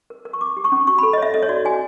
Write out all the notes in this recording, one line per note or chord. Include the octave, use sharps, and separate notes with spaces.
A#4
A#4
C#6
A#4 D6
G4
C#6
C#4
F#4 C#6
A4 B5
D#5
C#5 E5
A4 D#5
C#5
F#4 D5
F#4 G#5